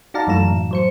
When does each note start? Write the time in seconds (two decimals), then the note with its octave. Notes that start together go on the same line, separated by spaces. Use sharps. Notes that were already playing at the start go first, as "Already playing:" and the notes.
0.14 D#4 F#4 D5 F5 A5 A#5
0.27 F#2 E3 F#3 A3 A#5 E7
0.51 A2
0.71 F#3 C5 C#7